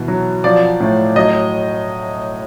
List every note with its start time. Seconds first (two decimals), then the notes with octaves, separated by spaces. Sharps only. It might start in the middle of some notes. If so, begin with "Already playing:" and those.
Already playing: B2 E3
0.08 F#3
0.44 F3 D5
0.80 A2
1.16 F#3 D#5